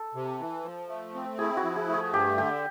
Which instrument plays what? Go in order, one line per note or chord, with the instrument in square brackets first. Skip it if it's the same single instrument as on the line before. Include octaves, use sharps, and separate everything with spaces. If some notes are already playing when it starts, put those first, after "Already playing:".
Already playing: [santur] A4
[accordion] C3
E3
F3
A3
C4
[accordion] E4 [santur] G#4
[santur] F#4
[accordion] F3
[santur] G#4
[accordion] A3
[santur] G#4
[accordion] G2 [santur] G4
[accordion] D3 [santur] G4